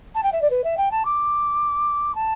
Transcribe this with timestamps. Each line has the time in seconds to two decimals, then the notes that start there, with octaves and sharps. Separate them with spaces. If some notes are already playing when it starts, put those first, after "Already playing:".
0.14 A5
0.23 G5
0.32 E5
0.41 D5
0.50 B4
0.64 E5
0.77 G5
0.91 A5
1.05 D6
2.15 A5